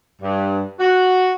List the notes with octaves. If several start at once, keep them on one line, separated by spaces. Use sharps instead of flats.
G2
F#4